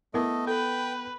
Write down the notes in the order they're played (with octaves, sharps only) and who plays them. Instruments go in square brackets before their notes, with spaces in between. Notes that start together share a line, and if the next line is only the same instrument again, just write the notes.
[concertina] A3 D#5 [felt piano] B3 [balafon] E4 A#4
[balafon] A4 [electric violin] B4 [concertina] G5